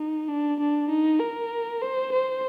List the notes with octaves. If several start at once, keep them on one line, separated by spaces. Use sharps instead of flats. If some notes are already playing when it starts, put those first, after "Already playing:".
Already playing: D#4
D4
D4
D#4
A#4
C5
C5